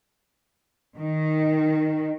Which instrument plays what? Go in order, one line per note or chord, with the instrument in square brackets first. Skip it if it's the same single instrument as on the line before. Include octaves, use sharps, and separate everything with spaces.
[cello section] D#3